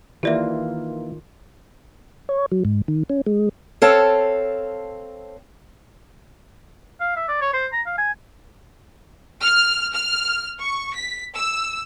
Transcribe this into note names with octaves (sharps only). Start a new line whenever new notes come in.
D#3 E3 A#3 F4 G4 D5 E5
C#5
F#3
G#2
D#3
C#4
G#3
C4 A4 C#5 F5 A5
F5
E5
D5
C#5
C5
A#5
F5
G#5
F6
F6
C#6
B6
E6